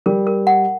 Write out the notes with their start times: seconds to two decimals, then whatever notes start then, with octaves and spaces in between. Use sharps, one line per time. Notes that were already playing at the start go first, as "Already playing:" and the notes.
0.06 G3 A#4
0.27 A#4
0.47 F#5